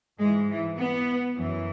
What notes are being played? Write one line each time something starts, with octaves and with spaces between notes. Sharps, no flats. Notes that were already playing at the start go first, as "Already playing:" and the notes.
G#2 E3 G#3
E3
B3
F#2 E3